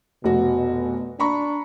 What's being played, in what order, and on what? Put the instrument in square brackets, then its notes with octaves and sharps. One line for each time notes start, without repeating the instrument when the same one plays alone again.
[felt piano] F1 F#4 [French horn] B2
[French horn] D4 [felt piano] A#5 B5 C#6